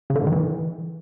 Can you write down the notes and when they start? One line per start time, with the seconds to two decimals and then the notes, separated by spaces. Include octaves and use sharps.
0.10 C#3
0.15 D3
0.21 G#2
0.27 D#3
0.32 E3